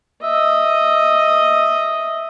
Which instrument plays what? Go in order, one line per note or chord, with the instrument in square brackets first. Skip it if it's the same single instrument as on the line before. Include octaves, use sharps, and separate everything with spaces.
[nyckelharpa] D#5 [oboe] E5